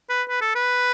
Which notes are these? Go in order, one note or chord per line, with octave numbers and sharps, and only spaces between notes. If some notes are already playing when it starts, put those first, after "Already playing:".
B4
B4
A4
B4